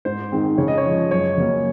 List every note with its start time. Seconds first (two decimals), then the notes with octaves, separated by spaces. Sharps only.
0.05 G#2 C5
0.32 D#3 G#3 C4
0.58 C#3 C#5
0.68 D#5
0.78 C#5
0.85 F3 G#3
1.11 F#2 C#5
1.38 C#3 F#3 A#3 C#4